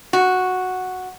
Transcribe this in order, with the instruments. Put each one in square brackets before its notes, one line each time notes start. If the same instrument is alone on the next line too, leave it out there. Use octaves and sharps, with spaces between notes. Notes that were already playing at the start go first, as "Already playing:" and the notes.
[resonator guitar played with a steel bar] F#4